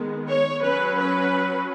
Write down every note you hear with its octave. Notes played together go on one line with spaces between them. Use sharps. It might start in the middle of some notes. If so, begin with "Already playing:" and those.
Already playing: D#3 G#3 B3
C#5
F#3 C#4 B4
B4